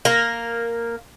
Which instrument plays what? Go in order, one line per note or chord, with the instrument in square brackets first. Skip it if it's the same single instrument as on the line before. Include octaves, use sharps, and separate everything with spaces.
[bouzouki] A#3 A#4